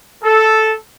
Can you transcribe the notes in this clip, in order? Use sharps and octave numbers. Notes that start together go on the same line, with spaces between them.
A4